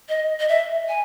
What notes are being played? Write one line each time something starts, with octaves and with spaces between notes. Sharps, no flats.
D#5
D#5
E5
G#5